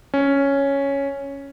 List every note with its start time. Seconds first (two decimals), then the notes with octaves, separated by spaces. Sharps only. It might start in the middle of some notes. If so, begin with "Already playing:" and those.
0.14 C#4